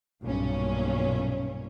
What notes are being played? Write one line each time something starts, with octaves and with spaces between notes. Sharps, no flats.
B1 G2 A#2 C#4